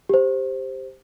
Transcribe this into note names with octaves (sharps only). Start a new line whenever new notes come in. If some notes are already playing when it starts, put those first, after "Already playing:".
G4 C5